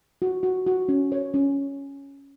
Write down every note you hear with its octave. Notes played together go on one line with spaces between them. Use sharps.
F#4
F#4
F#4
C#4
C#5
C#4